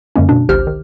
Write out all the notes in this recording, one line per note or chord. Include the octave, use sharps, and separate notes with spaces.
F#2 D3 G#3 A#3 C#4
B2 D4
G#1 C#2 G4 C5 F6
D#3